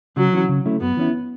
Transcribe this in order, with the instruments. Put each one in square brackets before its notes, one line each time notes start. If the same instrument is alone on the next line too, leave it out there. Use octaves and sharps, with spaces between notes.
[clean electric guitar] C#3 [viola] F#3
[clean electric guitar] E3 C#4 F#4
C#3
A3 C#4 E4
[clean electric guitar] F#2 [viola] B3
[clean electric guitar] E3 C#4 E4